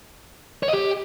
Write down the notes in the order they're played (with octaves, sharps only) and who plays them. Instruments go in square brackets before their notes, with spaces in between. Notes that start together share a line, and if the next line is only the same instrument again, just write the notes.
[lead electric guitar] C#5
D#5
G4